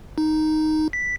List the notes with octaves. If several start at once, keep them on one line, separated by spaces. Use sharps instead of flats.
D#4
B6